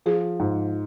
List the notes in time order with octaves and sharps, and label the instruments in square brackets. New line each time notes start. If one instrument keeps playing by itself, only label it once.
[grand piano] F3 [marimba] G#4
[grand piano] G#2